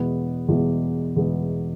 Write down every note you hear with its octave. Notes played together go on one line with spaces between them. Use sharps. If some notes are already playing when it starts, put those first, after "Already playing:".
Already playing: E2 B2 G#3 B3 E4
E2 B2 G#3 B3 E4
E2 B2 G#3 B3 E4